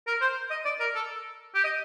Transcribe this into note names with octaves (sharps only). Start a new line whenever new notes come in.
A#4
C5
D#5
D5
A#4
A4
G4
D#5